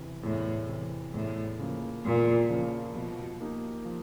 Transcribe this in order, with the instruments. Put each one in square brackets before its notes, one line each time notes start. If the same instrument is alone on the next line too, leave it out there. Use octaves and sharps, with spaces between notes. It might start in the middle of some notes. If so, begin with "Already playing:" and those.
Already playing: [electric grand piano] E2 C3 E3
[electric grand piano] E2 [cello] A2
[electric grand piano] C3 E3
[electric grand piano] E2 [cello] A2
[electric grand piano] C#3 F3 A#3
[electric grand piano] E2 [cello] A#2
[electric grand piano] C#3 F3 A#3
[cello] B2 [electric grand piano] F3
[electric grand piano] A#3 D#4 G4
F3